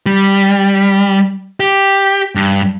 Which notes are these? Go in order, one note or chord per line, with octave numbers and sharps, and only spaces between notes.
G3
G4
G2